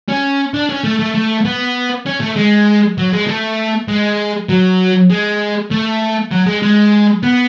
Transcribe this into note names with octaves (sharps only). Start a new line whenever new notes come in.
C#4
D4
C#4
A3
A3
A3
B3
C#4
A3
G#3
F#3
G#3
A3
G#3
F#3
G#3
A3
F#3
G#3
G#3
B3